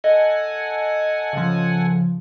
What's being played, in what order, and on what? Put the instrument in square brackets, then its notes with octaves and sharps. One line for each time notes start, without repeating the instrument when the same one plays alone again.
[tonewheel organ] A4 F#5 G#5 [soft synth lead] D#5
[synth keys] C#3 F3